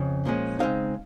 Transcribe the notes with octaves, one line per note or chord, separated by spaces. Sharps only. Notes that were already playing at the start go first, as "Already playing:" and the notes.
Already playing: F2 C#3
A#2 F3 G#3 C#4
C#3 G#3 C4 D#4 F5